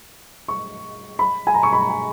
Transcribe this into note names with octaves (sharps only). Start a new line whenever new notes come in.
C#6
B5
G#5
A#5
C#6
B5
A#5
G#5